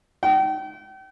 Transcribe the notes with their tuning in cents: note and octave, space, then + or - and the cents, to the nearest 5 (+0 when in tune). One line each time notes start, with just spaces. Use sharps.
G5 -35